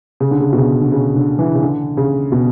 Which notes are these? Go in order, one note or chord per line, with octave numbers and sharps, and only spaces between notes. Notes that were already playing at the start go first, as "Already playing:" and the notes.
C#3
D3
C#3
B2
C#3
D3
C#3
D3
E3
C#3
D3
C#3
B2